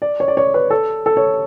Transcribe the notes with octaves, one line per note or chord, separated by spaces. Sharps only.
D5
C#5
D5
C#5
B4
A4
A4
C#5